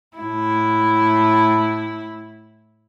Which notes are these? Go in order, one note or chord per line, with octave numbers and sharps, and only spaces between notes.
A2 E4